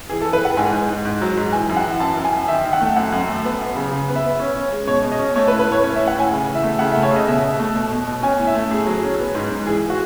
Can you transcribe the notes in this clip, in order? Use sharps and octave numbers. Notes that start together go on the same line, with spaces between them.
E3 G#4
A4
E3
B4
E3 F#5
G#2 G#5
G#2
G#2
G#2
F#3
G#2
E3 G#5
F#2
F#5
E3
F#2 A5
F#2
G#5
F#2
D#3 E5
D#3
F#5
A3
F#2 F#5
F#2
A3
B3
F#2
C#3
C#3
B3
E5
B3
C#4
C#4
G#3
B2 C#5
B2
D#5
C#4
A3 C#5
B4
A2
B4
A2 C#5
C#4 C#5
E5
A2
F#5
A2 G#5
C#3
E3
E5
A3
C#3 F#5
E5
A3
C#5
C#3 D#5
B2 E5
B2
A3
B2
B2
B2
C#4 G#5
A2
E5
A3
A2 G#4
F#3
C#4
B3
G#2
G#2
E3 G#4
F#4